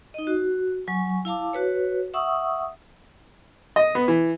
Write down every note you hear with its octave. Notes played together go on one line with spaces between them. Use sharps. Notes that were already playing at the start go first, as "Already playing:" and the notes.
D#4 D#5
F#4
F#3 G#5 C#6
E4 F5 A5 D6
F#4 B4 C#5
E5 F#5 C#6 D#6 E6
D#5
B3
E3